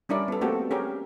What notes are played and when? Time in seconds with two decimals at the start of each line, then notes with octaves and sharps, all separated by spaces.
0.09 G3 C#4 D4 E4 A#4 D5
0.28 B3 A4
0.41 A3 A#3 C4 F#4 G4 A4
0.71 C#4 G4 G#4 A#4